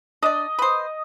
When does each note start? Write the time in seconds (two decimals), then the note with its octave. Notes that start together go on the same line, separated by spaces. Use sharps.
0.22 D4 D5 D#5
0.59 B4 C5